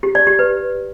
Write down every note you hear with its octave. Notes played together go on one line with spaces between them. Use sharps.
G4
D5
G4
B4